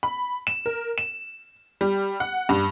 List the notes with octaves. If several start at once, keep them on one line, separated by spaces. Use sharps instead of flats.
B5
E7
A#4
E7
G3
F#5
G2